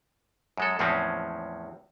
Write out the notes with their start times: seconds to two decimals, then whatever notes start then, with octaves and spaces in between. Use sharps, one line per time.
0.57 F#2 G#3 A4
0.79 E2 A2 F3 G#3 C4 C#4